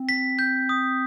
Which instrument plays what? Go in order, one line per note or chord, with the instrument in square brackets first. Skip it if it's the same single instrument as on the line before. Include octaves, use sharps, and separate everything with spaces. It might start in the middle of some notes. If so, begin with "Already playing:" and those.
Already playing: [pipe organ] C4
[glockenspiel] B6
G6
D#6